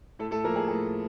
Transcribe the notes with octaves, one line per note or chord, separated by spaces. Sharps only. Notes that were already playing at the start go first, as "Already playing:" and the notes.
A2 A3 A4
A3 A4
F3 A#3 A#4
G#4
A2 G#4